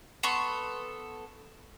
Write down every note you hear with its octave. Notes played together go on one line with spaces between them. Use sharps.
B3 A4 C6 C#6